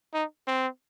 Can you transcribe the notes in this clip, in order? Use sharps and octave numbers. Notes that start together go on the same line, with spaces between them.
D#4
C4